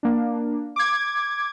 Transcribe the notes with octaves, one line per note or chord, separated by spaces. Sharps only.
A#3 D4
D6 G#6